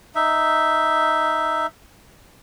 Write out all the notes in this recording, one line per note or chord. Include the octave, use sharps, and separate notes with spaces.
D#4 E5